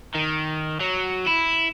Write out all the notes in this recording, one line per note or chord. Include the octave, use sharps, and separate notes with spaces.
D#3
F#3
E4